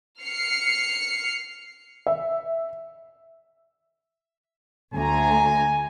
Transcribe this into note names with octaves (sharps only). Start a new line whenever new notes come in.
F6 C7 C#7
E5
D2 G#5 A#5